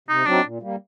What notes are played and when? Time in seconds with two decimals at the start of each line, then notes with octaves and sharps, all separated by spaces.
0.08 C3 D#4
0.26 F#3 C4 D4 D#4 F#4
0.44 A#2
0.62 G3 A#3